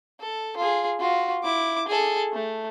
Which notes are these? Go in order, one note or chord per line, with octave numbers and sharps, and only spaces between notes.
A4
F4 G#4
F4 F#4
E4 D6
G#4 A4
A3